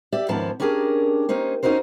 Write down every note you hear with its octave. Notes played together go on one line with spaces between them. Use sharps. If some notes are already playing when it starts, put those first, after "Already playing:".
G4 D5 E5
D#2 G#2 F3 B3 C#4 A5
C#4 D4 G4 G#4 A#4
A#3 C#4 D#4 C5
C#4 D#4 F#4 A#4 C5